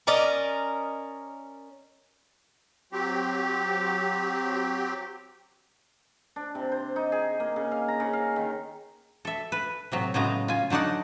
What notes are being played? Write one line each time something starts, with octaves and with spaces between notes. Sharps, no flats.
C#4 A#4 D5 D#5
F#3 C4 G4
D4
C3
C5
D#4
G#4
A#3
C#3
F5
A#5
C#3
F5
D#3
A4 E5
B4
A2 C3 F#3
A2 C#3 F#3 G#3 B3 A#5
F4 G#5
D3 F#3 D#4 D5 F#5